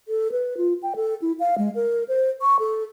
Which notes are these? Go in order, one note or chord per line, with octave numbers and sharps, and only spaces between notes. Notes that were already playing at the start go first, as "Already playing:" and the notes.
A4
B4
F4
G5
A4
E4
F5
G#3
A#4
C5
C#6
A4